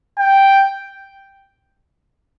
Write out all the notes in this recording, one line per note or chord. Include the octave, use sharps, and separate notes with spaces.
G5